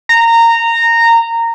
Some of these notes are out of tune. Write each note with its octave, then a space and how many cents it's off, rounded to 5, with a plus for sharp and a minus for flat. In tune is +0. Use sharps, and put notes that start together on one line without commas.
A#5 -15